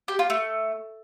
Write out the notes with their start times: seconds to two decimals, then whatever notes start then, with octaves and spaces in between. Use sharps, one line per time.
0.08 G4
0.19 F4
0.30 A3